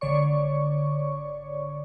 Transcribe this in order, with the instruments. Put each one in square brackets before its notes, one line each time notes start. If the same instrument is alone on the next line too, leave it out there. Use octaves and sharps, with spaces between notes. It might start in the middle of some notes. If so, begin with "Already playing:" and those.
[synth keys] G#1 D3 C#5 D5 C#6